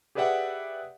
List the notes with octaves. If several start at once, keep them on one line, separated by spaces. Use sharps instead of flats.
G4 G#4 B4 D5 E5 F#5